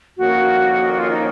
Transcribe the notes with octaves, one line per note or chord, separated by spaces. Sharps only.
F2 D#3 A#3 C#4 F#4
F4
D#4